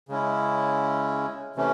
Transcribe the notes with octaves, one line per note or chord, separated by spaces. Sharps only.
C#3 G#3 C#4 E4
C3 E3 A3 C#4